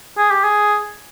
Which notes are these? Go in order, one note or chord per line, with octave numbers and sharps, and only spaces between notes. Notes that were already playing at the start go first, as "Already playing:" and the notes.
G#4
G4
G#4